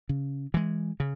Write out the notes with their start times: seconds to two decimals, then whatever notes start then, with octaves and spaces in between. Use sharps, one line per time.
0.09 C#3
0.54 E3 G#3
1.00 C#3